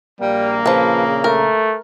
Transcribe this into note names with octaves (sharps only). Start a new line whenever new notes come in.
A#1 A#2 G3 A#3
C#3 F3 B4
A3 A#4